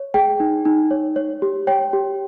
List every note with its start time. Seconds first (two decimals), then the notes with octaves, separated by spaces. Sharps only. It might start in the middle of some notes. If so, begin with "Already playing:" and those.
Already playing: C#5
0.14 G#4 G5
0.40 D#4
0.65 D#4
0.91 C#5
1.16 C#5
1.42 G4
1.67 C#5 G5
1.93 G4